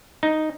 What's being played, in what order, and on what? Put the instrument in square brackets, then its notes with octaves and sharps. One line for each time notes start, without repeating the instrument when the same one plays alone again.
[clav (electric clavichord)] D#4